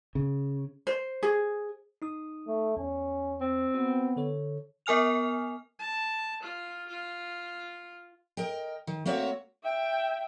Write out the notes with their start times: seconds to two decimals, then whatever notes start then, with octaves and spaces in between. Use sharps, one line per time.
0.15 C#3
0.87 C5
1.23 G#4
2.02 D#4 D#6
2.47 A3
2.77 E2 C#4
3.40 C4
3.74 B3 F#4 C5
4.16 D3 A4 C#5
4.86 B3 A#4 G#5 F6 F7
5.79 A5
6.42 F4
6.88 F4
8.37 A#4 D#5 G5
8.87 D#3
9.06 A3 A#3 C4 F#4 C#5 E5
9.63 E5 G5